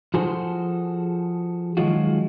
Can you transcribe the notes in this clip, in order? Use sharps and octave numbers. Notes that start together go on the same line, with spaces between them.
F3 F#4 G#4 A4 C5
D#3 F3 F#3 G#3 F4 F#4